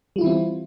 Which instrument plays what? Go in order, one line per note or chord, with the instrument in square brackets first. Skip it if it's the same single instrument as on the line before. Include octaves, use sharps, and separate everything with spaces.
[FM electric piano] G3
F4
E4
E3
C4